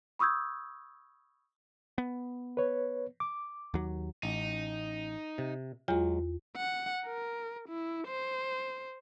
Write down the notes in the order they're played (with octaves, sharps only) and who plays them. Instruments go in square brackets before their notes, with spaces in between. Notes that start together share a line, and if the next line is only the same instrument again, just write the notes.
[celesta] B5 C#6 D#6 E6 G6 G#6
[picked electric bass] B3
[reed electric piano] B4 C#5
D6
[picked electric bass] D#2 F#3
[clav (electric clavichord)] A1 [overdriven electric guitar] D#4
[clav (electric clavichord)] C3
[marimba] E2 F4 [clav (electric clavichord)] F#3 G#3
[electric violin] F#5
A#4
E4
C5